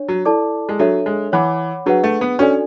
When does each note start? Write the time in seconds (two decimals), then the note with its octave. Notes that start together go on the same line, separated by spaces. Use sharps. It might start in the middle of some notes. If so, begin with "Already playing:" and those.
Already playing: D4 C#5
0.08 F#3
0.25 E4 A4 D5 A5 D6
0.69 G#3
0.79 F#3 D4 A4 C#5 E5
1.06 G#3
1.32 E3 C#5 F#5 B5 D6
1.86 F#3 D4 G#4 B4 F#5
2.04 A3
2.21 B3
2.39 C#4 D4 F#4 A4 D5 G#5